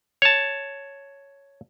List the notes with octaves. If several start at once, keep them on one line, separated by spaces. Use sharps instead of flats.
C#5 A5